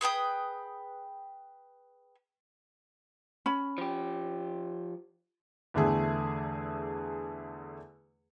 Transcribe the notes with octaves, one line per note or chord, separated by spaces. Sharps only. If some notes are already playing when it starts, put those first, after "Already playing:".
G#4 B4 G5 D#6
C#4 B5
F3 G4
E2 D3 A3 G#4